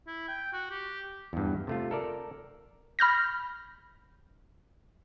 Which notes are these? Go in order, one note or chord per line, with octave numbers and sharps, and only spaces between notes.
E4
G5
F#4
G4
E2 G2
C3 A3 F4
A4 A#4 D5
B5 F6 G6 A#6